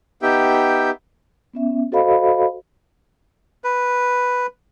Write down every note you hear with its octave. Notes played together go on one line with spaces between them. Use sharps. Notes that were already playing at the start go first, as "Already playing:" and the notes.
B3 D#4 G4 E5 G5
B3 C#4 E5
F#4 A4 C5 D#5 F5 B5
B4